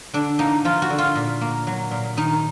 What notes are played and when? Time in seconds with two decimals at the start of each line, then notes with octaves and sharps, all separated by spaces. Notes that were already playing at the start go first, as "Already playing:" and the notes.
0.14 D3 D4
0.39 A#3 D#4
0.65 F3 F4
0.82 F#4
0.90 D3
0.98 F4
1.15 A#2
1.41 A#3
1.67 F#3
1.91 A#2
2.17 D#3 D#4